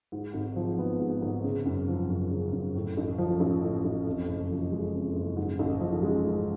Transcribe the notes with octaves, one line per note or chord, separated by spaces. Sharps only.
G#2
G#1
F3
B3
G#2
G#1
C#3
F#2
F3
F#2
C#3
F#2
A2
A1
F3
A1
A2
A1
F2
F#1
F3
G#3
F2
F#1
G#2
A1
F3
G#3
G#2